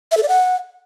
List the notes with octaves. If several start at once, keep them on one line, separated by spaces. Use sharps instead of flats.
E5
A4
D5
F#5